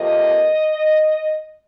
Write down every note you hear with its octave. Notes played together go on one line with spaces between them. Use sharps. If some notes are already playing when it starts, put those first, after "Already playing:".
Already playing: F2 C3 F3 A#3 D#5